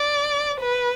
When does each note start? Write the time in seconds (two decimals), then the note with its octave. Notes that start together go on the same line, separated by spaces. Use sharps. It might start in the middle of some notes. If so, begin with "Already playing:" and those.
Already playing: D5
0.60 B4